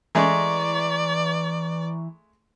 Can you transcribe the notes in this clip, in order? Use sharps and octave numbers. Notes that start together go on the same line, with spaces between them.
E3 G#3 A3 G#4 D5 A#5 C#6